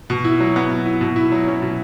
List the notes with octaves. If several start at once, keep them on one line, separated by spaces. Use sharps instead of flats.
B2
E4
F#3
B3
B2
E4
B2
E4
F#3
C#4
B2